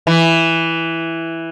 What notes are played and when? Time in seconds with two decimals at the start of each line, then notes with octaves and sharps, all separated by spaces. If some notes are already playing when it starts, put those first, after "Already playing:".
0.07 E3